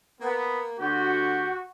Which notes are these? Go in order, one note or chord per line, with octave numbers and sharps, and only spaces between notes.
A#3 B3
D2 F#4 G4